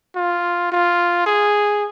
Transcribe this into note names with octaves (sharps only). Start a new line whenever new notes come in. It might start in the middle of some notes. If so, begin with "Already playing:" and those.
F4
F4
G#4